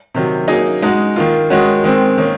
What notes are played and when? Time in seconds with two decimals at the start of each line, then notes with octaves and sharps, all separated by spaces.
0.14 C3 D#3 F#3
0.48 F#3 A#3 D#4 G#4
0.82 G#3 D#4 F#4
1.16 D#3 A#3 F4
1.50 D#3 G#3 C#4 F#4
1.84 D#3 G#3 C4
2.18 D#3 A#3 C#4